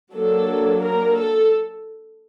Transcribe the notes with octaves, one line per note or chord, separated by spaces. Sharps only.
F#3 A#3 D4 A4
A#4
A4